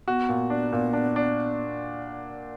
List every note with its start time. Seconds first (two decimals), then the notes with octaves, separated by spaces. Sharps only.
0.08 B3 F#4
0.29 A#2
0.50 D4
0.72 A#2
0.93 D4
1.16 D4